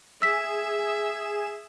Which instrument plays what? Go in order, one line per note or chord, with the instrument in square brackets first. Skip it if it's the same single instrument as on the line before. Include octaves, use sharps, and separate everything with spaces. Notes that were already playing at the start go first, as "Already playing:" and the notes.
[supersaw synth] G#4 E7 [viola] E5 [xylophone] E6 B6